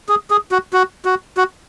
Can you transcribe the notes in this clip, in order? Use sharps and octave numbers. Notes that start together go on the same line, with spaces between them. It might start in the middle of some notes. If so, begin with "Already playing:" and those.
G#4
G#4
F#4
F#4
F#4
F#4